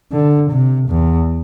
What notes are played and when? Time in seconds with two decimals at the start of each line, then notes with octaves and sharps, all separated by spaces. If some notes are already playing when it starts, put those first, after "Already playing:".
0.12 D3
0.51 C3
0.89 E2